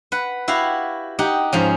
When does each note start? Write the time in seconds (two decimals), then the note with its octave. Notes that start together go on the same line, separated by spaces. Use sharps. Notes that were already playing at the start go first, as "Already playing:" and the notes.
0.12 B4 F#5
0.48 E4 F#4 G4 F5
1.19 D#4 G4 F#5
1.53 G#2 F3 C#4